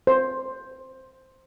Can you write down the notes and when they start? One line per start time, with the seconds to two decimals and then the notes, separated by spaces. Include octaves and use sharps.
0.07 C5